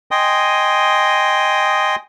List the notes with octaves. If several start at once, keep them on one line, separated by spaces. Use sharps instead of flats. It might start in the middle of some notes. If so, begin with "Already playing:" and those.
D#5 G5 G#5 C6 D#6